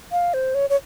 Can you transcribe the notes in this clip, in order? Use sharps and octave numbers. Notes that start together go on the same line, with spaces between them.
F5
C5
C#5
C#5